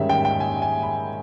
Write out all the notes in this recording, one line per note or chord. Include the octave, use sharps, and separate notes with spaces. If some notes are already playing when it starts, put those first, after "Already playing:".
Already playing: G#2 D#3 G3 C#4 E5
G5
G5
G#5
G#5
B5